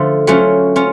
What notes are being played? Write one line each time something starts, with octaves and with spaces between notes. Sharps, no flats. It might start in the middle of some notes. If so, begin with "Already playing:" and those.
Already playing: D3 F3 A3 F4
F#3 A3 C#4 F4
C#4 F4